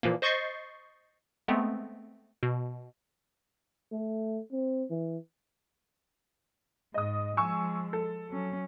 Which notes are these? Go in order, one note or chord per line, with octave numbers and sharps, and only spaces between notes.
A#2 E3 F3 A#3
C5 D#5 C#6 G6 A6 C7
G#3 A3 B3 C4
B2
A3
C4
E3
G#2 D#5 D#6
F3 G#3 G#5 C#6 E6
A4
F#3 C#4